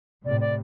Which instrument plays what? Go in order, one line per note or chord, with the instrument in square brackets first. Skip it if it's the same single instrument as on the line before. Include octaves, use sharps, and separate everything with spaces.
[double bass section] A2 C3 [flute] D5
[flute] D5